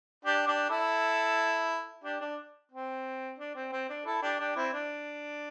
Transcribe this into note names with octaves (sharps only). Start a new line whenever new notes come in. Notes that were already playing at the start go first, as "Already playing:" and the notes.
D4 G4
D4 G4
E4 A4
D4 G4
D4
C4
D4
C4
C4
D4
E4 A4
D4 G4
D4 G4
C4 E4
D4